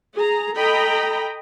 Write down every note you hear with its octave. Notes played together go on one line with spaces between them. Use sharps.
G#4 A#5
A4 D#5 G5 A#5 B5